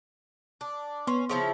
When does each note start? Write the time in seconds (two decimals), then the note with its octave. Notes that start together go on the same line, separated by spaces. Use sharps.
0.61 D4
1.07 B3 C#4 C6
1.29 C#3 F3 E4